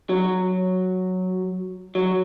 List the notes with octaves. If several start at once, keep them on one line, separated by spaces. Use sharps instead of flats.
F#3
F#3